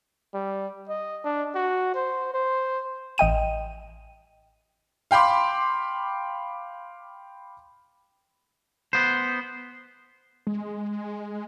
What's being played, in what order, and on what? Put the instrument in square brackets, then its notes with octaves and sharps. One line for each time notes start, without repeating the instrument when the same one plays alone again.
[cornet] G3
D#5
D4
F#4
C5
C5
[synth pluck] A1 D#5 G5 D#7
[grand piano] F5 G5 B5 C6 D6
[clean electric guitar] B3 C5
[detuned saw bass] G#3